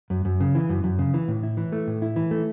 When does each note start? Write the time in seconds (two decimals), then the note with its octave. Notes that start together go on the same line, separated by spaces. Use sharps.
0.10 F#2
0.25 F#2
0.40 C#3
0.55 E3
0.69 F#2
0.84 F#2
0.99 C#3
1.14 E3
1.28 A2
1.43 E4
1.57 E3
1.72 A3
1.87 A2
2.02 E4
2.16 E3
2.31 A3